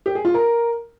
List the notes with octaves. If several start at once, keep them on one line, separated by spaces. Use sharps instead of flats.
G4
G#4
F4
A#4